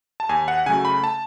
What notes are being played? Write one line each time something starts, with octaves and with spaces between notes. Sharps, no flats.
A5
D#2 G#5
F#5
C#3 F#3 A3 G#5
B5
A5